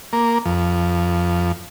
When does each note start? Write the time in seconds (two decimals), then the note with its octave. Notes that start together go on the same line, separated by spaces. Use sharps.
0.13 A#3
0.46 F2